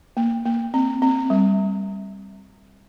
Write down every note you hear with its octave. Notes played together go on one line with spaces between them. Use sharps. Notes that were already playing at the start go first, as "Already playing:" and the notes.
A#3
A#3
C4
C4
G3